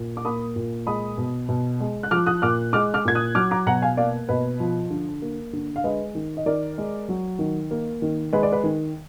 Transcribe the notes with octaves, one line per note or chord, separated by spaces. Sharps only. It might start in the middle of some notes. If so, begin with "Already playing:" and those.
Already playing: A#2
D6
A#3 B5 D#6
A#2
G#3 B5 D#6
B2
B2
G#3
F#6
F3 D6 F6
D#6 F#6
A#2 D6 F6
G#3 D6 F6
D6 F6
A#2 G#6
D#6 F#6
F#3 D6 F6
A#5 D6
B2 F#5 A#5
F5 G#5
A#3 D5 F5
B2 B4 D#5
F3
D3
A#3
D3
F5
G#3 B4 D#5
D#3
D#5
D#3 A#4 D5
G#3
F#3
D#3
A#3
D#3
G#3 B4
D5
B4
D#3